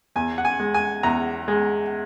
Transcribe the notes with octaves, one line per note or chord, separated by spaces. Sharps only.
E2 G#5
F#5
G#5
G#3
G#5
E2 A#5
G#3